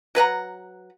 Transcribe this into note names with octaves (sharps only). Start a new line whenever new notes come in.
F#3 B4 F#5 A#5